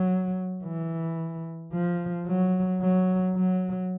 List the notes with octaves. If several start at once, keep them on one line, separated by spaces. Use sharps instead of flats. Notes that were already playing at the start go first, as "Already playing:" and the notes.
Already playing: F#3
E3
F3
F#3
F#3
F#3